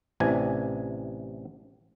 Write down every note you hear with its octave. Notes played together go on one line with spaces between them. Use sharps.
A1 C3 E3 D4 G#5